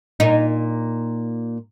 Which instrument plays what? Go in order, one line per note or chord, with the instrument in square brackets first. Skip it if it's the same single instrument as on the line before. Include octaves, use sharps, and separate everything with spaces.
[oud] A#2 D#4